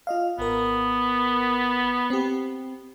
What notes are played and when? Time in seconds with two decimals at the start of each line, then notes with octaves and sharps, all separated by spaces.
0.07 F4 D#5 F5
0.39 G#1 B3 A#4
2.10 C4 G4